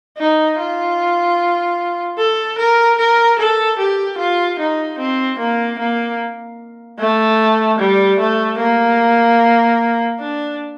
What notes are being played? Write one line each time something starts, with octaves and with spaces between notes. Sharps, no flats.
D#4
F4
A4
A#4
A#4
A4
G4
F4
D#4
C4
A#3
A#3
A3
G3
A3
A#3
D4